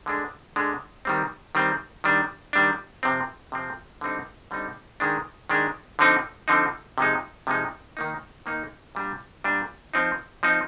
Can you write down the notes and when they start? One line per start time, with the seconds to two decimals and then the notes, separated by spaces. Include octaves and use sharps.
0.06 D3 G#3 D4
0.56 D3 G#3 D4
1.05 D#3 G3 C4
1.55 D#3 G3 C4
2.04 D#3 G3 D4
2.53 D#3 G3 D4
3.03 C3 F3 C4
3.52 C3 F3 C4
4.01 D3 G3 C4 D#4
4.51 D3 G3 C4 D#4
5.00 D#3 G#3 D4
5.49 D#3 G#3 D4
5.99 D3 F3 C4 D#4
6.48 D3 F3 C4 D#4
6.98 C3 F3 G#3 D#4
7.47 C3 F3 G#3 D#4
7.97 D#3 A#3 D#4
8.46 D#3 A#3 D#4
8.95 A#2 G3 D4
9.44 A#2 G3 D4
9.94 F3 C4 D#4
10.43 F3 C4 D#4